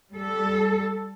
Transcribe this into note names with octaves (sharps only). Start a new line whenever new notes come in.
G3 A4